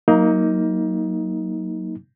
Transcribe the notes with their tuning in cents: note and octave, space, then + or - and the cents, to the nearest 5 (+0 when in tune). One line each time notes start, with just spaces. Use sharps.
F#3 +0 A#3 +0 D#4 +20